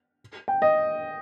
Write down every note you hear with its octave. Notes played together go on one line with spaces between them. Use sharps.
G5
D#5